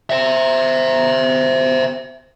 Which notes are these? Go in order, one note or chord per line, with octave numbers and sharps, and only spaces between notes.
C5 E5